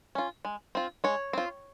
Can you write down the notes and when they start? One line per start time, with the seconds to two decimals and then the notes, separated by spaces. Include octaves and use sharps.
0.15 C#4 F4
0.45 G#3
0.75 C4 F4
1.04 G#3 C#5
1.33 C4 F4